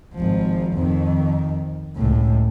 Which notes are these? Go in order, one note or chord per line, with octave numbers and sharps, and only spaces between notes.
G#1 F3
F2 D#3
C#2 A2